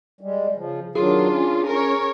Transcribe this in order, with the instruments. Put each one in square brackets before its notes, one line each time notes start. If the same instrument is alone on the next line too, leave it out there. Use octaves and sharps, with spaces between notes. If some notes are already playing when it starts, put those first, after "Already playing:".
[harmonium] G3 G#3
C#3 F3
[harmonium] D#3 F#3 [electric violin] D4 F4 [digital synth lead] G#4
[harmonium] C#4
[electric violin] A#4 C#5